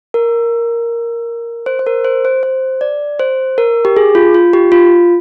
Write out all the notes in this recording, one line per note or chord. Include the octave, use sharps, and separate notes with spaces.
A#4
C5
C5
A#4
C5
C5
C5
D5
C5
A#4
G4
G#4
F4
F4
G4
F4